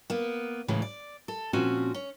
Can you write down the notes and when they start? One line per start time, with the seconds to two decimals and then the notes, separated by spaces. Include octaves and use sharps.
0.10 A#3 B3
0.68 A2 C#3 E3 G#3
0.82 D5
1.28 A4
1.53 A#2 F3 C4 C#4 F#4
1.95 C#4